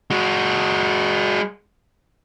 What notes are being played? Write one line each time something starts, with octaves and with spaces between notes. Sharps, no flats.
G#3 F#4